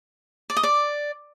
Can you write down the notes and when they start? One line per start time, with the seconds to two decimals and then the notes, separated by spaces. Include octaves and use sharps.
0.50 D5
0.57 D#5
0.63 D5